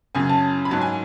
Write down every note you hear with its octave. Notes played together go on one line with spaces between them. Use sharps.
F#2 C#3 F#3 G#5
A5
B5
G#2 F#3 A5
G#5